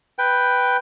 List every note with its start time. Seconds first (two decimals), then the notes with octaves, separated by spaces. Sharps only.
0.18 B4 G5